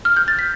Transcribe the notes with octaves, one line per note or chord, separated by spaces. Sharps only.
F6
G6
A6
B6